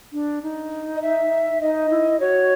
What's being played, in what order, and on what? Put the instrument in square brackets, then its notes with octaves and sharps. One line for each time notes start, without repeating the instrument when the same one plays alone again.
[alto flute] D4
D#4
[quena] D#5
E5
[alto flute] D#4 [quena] D#5
[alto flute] E4
[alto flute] F#4 [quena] C#5